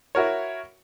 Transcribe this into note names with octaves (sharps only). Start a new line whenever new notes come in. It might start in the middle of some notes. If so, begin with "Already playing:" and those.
E4 F#4 A#4 C#5